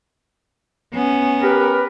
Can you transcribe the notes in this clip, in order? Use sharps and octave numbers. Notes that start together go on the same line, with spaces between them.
B3 C#4
G4 A#4 B4